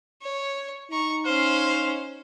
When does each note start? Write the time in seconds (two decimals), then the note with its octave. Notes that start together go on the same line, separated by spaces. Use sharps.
0.22 C#5
0.92 D#4 A#5 C#6
1.25 C#4 C5 F5